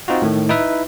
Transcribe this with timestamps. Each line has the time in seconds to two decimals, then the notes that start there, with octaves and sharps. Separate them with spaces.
0.08 C4 D#4 F4 F#4
0.22 A2 D#3
0.49 D#4 E4 B4 E5